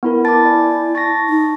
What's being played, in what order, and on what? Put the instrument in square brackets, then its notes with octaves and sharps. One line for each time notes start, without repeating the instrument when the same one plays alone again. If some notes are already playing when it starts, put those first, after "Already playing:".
[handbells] B3 E4 A#4
[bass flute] E4 [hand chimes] A5 B5 D6 [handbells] A6
[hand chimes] D5 G#5
[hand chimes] A5 C#6 [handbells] A6 A#6
[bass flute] D#4